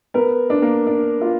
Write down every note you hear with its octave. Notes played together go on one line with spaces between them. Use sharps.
B3 A#4 B4
D4
A#3 A#4
D4
F4